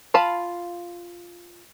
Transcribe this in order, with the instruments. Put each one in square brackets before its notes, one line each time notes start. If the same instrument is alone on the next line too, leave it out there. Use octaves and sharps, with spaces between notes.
[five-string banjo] F4 F5 A5 B5